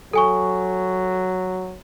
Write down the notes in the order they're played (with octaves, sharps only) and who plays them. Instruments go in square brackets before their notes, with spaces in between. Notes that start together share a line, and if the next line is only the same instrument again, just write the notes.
[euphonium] F#3 [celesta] A4 G#5 C#6